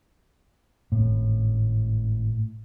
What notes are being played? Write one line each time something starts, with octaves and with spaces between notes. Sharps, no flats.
G#1 A2